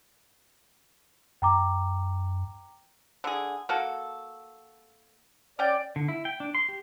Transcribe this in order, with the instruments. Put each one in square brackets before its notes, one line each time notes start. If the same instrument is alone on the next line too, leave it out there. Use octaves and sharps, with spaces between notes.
[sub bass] F#2 [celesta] G5 A#5 D6
[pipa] D3 G#4
A#3 F#4 A4
[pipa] C#4 G5 [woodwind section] D5
[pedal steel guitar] D3
E4
G5
D4
C6
G4